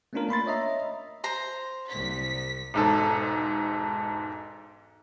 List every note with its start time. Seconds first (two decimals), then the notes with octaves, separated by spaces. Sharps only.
0.13 A3 B3 C#4 D4 F4 A#4
0.29 A#3 B5 C6 A6
0.46 C#5 D#5 E5 A#5
1.24 C5 A#5 C6
1.90 C2 B6
2.74 E1 G#2 A4